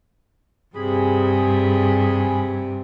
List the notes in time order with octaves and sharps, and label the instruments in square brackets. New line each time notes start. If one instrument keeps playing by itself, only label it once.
[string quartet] G2 C3 [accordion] G#4 B5